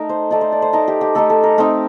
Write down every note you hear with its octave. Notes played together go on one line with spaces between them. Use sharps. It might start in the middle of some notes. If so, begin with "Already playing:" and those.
Already playing: A3 D#4 A#4
C5
A3 D#4 D5
C5
D5
C5
A3 D#4 A#4
G4
G4
A3 D#4 A4
A4
A#4
A3 C4 D#4 A#4